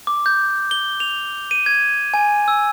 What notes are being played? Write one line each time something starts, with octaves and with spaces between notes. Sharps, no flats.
D6
G6
G7
F7
D#7
G#6
G#5
E6